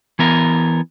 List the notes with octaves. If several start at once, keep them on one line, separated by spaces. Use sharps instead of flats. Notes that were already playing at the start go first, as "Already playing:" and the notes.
E3 B3 A#4